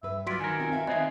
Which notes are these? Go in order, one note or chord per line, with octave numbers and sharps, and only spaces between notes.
G2 B4 E5
F#3 F4 F#4 D5 C6 B6 D7
D#3 A#4 G#5
C4 F4 F#4
B4 E5 F5
D#3 B3 C4 D#4 C#5 D#5 E5 G#5